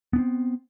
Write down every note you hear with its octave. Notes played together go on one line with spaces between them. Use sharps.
B3 C4 D4